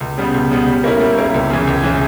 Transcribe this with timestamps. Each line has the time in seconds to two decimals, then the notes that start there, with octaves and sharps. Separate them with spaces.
0.01 C#2
0.18 C#3 G3 B3
0.34 C#2
0.51 C#3 G3 B3
0.67 G3
0.84 A#3 C#4 E4 A#4
1.00 G3
1.18 A#3 C#4 E4 A#4
1.34 C#2
1.50 C#3 E3
1.67 C#2
1.84 C#3 E3